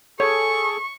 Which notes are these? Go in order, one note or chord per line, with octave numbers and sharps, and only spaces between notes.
G#4 A4 C#5 C#6